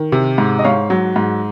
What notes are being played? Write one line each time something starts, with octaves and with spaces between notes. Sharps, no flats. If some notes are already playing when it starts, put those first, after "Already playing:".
Already playing: D#3
C3
G#2
D#5
G#2 C#5 F5
F#3
G#2